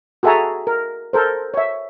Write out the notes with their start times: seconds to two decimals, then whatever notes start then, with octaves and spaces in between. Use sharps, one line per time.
0.23 F#4 G#4 A4 E5 G#5 A#5
0.67 A#4
1.13 A4 A#4 C5
1.54 C#5 E5